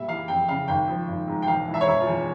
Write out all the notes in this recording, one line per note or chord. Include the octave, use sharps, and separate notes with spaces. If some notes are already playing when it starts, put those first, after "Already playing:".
Already playing: A#2 G3 E5
E3 F5
F2 G5
C#3 F5
G#1 G5
F3
G#1
G#2
G5
E1 F5
E3
E5
C#5
E1 E5
F4
E2